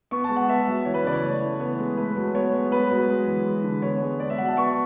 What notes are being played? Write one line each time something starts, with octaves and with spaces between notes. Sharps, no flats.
B3 C#6
G#3 A5
F#5
B3 E5
F#3
E3 C#5
B4
C#3 D5
C#5
A3
E3
B3
G#3
A3 B4
F#3
B3 C#5
G#3
B3 B4
F#3
G#3
E3
G#3
D3
B3 C#5
G#3
B3 D5
E5
F#3 F#5
A5
B3 C#6